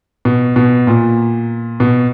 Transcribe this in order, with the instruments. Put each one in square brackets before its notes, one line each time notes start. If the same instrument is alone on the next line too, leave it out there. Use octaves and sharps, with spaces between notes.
[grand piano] B2
B2
A#2
B2